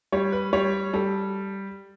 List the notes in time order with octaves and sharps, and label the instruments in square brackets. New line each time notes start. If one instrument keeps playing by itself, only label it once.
[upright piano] G3 [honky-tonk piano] C#5
[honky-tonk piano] B4
[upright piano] G3 [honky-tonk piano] C#5
[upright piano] G3 [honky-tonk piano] A4